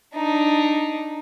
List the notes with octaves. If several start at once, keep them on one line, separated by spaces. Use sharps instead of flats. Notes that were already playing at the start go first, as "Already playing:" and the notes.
D4 D#4